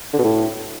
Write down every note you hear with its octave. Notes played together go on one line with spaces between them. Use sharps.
D3
B2
A2